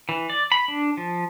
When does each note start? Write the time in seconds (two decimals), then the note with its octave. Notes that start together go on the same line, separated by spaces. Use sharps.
0.09 E3
0.30 D5
0.52 B5
0.68 D4
0.97 F3